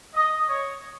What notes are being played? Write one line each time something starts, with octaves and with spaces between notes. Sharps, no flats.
D#5
C#5